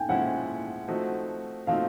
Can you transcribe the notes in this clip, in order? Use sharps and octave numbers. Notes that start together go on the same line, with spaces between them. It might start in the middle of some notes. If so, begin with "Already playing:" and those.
Already playing: G5 G#5
F3 G#3 C#4 E4 F#5
F3 A3 C4 D#4 F#4
F3 A3 C4 D#4 F#4 F5